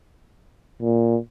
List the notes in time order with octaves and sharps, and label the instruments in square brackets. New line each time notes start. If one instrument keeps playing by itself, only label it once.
[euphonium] A#2